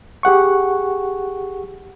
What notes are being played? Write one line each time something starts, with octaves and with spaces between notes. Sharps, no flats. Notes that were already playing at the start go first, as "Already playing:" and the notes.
G4 G#4 F#5 C#6